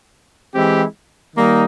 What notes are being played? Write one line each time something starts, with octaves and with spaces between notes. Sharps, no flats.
E3 G#3 C4 E4 G4
D#3 G3 A#3 D#4